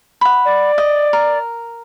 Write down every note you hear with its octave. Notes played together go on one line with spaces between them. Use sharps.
F#5 B5
D5
D#5
A#4